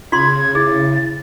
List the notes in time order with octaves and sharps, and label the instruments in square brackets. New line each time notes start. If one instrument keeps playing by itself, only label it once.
[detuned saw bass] C#3 [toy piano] F4 C6 [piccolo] G#6
[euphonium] E4 [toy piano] G#4 [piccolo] A6